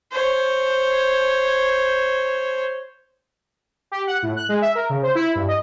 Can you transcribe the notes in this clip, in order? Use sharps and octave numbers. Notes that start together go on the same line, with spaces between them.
C5 C#5
G4
F#5
A2
F#6
G#3
E5
A#4
C#3
C5
E4
G2
D#5